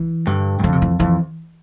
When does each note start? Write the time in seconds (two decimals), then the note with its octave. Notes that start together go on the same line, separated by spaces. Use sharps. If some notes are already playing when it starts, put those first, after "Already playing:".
Already playing: E3
0.27 G2 D3
0.59 G2
0.63 F2 D3
0.72 C3
0.82 E3
1.00 F2 E3